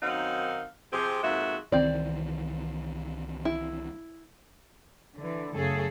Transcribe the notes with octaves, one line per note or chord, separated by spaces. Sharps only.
F#2 D#3 C4 D#4 F5 F#5
C3 F3 C4 G4 G#4
F2 G#2 A#3 F#4 E5
C2 D#3 E3 C4 D5
E4
D3 E3
F#2 C#3 A3 G#4 A4